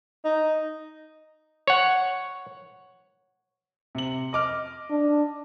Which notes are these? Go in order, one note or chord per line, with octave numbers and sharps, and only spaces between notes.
D#4
C#5 F#5
C3 F#7
D#5 D6 F6
D4